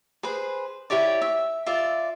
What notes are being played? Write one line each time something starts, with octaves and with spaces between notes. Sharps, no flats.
G#4 B4 C5
E4 G4 C#5 D5
E5
F4 D5 E5